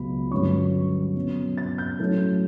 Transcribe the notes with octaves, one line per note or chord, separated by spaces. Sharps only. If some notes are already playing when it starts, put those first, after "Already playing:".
Already playing: C#2 B2 F#3 B5
G2 D3 F#3 C#4 C#6
B2 F#3 C#4
A6
G6
A2 F#3 A3 C#4